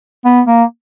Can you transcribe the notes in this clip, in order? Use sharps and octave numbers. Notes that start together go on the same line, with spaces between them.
B3
A#3